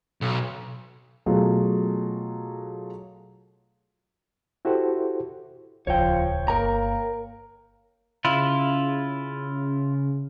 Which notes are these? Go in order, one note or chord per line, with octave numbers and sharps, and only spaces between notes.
B1
B2 F#3 A3 F4 G#4
E4 F#4 G4 A4 C5
D#1 C#2 F3 C#5 G5
G1 A#3 A#4 A#5
C#3 E4 F4